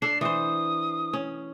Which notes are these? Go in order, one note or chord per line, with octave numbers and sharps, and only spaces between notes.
D4 A4 C7
E3 C5 D#6
C#4